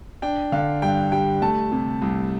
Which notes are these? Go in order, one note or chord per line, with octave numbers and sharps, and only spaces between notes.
D4 G5
D3 F5
G2 G5
G3 G5
A3 A5
C3
C2